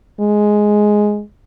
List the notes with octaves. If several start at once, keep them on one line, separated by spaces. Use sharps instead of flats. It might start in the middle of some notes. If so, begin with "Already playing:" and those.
G#3